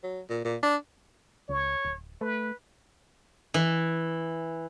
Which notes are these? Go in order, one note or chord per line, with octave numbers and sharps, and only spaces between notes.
F#3
A#2
A#2
D4
C#2 C#5
D1
A3 B4
E3